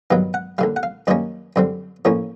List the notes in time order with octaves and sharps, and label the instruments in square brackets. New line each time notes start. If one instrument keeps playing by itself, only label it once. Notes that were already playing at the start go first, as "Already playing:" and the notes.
[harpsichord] G2 D#3 F#3 B3 F5
F#5
D#2 D3 G3 F5
F#5
F5
F#2 D#3 G3 A#3 C#4 D5
F#2 D3 G3 C4
A1 A2 F3 A#3 C#4 C#5